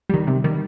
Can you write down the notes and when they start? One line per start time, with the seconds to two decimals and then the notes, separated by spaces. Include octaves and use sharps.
0.10 D#3 G3
0.27 C3
0.44 D#3 G3